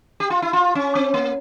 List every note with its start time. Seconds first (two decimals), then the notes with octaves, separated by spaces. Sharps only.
0.20 G4
0.30 F4
0.42 E4
0.53 F4
0.75 C#4
0.95 C4
1.14 A#3